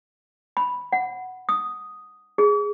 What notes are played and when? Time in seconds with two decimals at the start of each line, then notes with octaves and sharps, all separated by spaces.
0.57 B5
0.92 F#5
1.49 D#6
2.38 G#4